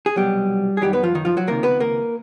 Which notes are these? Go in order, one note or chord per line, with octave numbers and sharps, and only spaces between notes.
G#4
C2 B2 F#3 G3 G4
G#4
F#2 D#3 F#3 G3 G4
B3 B4
F3 F4
D#3 D#4
F3 F4
F#3 F#4
C#2 C3 D#3 A#3 A#4
B3 B4
A#3 A#4